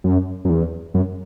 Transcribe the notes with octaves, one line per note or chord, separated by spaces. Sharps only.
F#2
F#2
E2
F#2